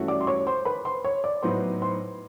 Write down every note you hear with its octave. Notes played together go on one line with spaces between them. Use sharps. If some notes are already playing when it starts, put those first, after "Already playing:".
Already playing: G2 E3 A3 C#4 F#4
D5 D6
C6
C#5 C#6
C5 C6
B4 B5
C5 C6
C#5 C#6
D5 D6
A2 F#3 B3 D#4 C5 C6
C5 C6